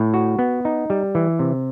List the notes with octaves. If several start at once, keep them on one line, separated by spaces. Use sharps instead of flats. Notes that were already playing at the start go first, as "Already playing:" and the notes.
Already playing: A2
F#4
B3
D#4
G3
E3
C3